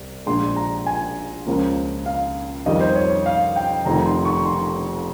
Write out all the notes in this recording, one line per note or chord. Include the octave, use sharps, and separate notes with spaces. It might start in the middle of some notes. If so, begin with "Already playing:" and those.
Already playing: C2 C3
A#1 A#2 F3 G#3 C6
A#5
G#5
C#2 C#3 F3 A#3 C#4
F5
F2 D#3 G3 D#5
C5
C#5
F5
G5
F1 F2 D#3 A#5
C6
C#6
C6